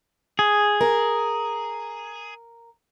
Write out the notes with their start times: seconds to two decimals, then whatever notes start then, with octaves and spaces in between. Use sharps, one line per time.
0.39 G#4
0.81 A#4